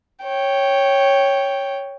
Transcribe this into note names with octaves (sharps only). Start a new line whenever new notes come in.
C#5 G5